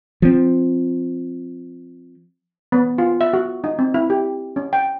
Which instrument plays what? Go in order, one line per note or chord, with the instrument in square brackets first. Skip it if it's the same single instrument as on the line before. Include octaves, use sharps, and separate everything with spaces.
[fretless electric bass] F3 C4
[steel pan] B3
F4
E5
F#4
D#4
C4
E4
G4
C#4
G5